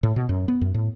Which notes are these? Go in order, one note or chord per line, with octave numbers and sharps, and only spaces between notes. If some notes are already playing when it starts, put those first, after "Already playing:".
A2
B2
F#2
B3
F#2
A2